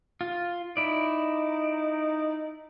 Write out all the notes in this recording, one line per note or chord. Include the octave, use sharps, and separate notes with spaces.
F4
D#4 E4 D5